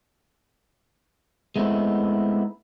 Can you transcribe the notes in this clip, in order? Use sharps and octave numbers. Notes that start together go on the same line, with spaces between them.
G#3 A3 B3 C4 D#4 E4